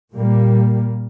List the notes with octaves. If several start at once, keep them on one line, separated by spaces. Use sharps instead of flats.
A#2 G3 A#3